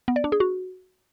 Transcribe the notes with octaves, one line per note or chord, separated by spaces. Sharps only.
B3
D5
D4
G#4
F#4